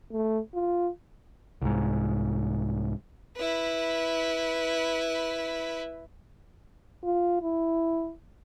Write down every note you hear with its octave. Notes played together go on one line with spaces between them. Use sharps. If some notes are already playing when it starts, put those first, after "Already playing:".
A3
F4
C2 G#2
E4 B4
F4
E4